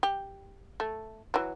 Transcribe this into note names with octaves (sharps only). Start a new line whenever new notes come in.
G4
A3
E3 F#3